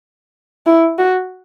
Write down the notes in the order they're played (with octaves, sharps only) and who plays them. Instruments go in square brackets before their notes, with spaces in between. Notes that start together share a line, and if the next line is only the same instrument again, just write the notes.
[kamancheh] E4
F#4